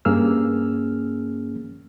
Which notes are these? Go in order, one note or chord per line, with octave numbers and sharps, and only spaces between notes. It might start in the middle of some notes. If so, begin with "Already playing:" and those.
G2 A#3 C#4 G#4 E6 F6